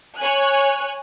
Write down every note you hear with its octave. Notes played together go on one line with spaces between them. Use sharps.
C#5 G#5 F#6